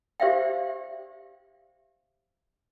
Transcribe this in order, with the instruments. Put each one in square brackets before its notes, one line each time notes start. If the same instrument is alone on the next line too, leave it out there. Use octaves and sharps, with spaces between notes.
[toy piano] G4 C5 D5 E5 F5 G5